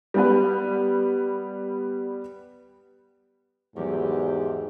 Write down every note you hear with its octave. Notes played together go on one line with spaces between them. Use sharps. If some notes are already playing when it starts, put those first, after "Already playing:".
G3 B3 B4
E2 G#2 D#3 F#3 A3 G4